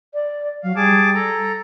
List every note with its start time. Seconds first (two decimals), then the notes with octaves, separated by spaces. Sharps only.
0.14 D5
0.63 F#3 F5
0.76 G3 G#4 A5 D6
1.14 A4 A#5